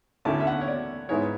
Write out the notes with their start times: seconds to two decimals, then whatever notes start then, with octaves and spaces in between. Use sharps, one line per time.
0.25 D2 D3 A3 C#4 E4 A5
0.40 E5
0.47 F#5
0.61 C#5
0.68 D5
1.09 G#2 G#3 B3 E4 C#5